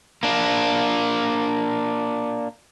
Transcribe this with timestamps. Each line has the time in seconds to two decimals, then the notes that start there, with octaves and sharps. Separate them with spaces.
0.23 A#3 D4